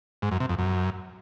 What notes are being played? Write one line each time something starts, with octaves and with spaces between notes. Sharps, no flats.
G#2
F#2
C3
F2
F#2